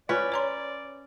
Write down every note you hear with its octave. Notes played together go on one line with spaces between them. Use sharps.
C#4 F4 B4 D5
C#5 A#5 C6